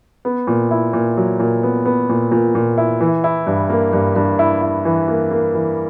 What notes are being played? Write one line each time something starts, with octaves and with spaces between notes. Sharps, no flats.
B3
A#2
E4
A#2
F#3
A#2
B3
B3
A#2
A#2
A#2
E4
E3
E4
G2
A#3
G2
G2
E4
E4
E3
A#3
A#3
E3